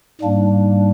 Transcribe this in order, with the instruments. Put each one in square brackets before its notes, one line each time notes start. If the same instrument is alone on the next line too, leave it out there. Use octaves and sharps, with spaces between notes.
[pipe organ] G#2 G3 A#3 D4